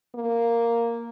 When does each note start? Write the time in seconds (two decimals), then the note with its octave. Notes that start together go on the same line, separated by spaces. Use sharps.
0.15 A#3